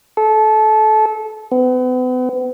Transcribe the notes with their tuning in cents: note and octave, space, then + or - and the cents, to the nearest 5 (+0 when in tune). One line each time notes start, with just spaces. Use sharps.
A4 -25
B3 +40